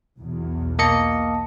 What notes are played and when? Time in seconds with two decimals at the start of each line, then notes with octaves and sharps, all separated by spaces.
0.19 B1 E2 B2
0.79 A#3 D#5 A5 C#7